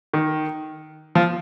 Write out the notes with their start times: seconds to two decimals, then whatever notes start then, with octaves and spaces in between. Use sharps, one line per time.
0.14 D#3
1.15 F3